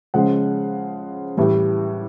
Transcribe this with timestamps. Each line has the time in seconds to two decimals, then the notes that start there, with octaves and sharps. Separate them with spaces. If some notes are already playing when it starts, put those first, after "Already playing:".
0.14 C#3 F3 G#3 F#5
1.37 A2 E3 G3